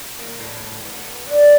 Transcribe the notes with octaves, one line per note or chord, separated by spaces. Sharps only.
A#3
A2
B3
D4